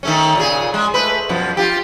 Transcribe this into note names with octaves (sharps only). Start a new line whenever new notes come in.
D#3 A3 C#4
A#2 C#3 G#4
G#3
A3 B4
F#2 B2 F3
F4 G4